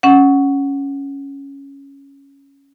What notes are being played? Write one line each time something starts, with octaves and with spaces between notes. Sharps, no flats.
C#4 F#5